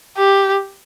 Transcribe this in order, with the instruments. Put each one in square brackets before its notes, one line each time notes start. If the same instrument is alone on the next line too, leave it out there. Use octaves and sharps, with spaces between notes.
[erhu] G4